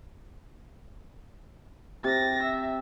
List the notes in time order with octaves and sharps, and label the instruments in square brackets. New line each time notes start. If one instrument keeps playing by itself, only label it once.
[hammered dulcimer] C3 [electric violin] A6 A#6
[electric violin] E5